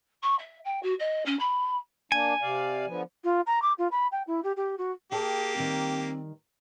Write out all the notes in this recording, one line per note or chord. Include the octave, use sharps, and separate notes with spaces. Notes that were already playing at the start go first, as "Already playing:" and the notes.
C#6
E5
G5
F#4
D#5
C#4
B5
A#3 D4 G#5
C3 D5 F5
D3 F3 B3
F4
A#5
D6
F4
B5
G5
E4
G4
G4
F#4
A#3 G4 G#4 G5 A5
D#3 G3 C4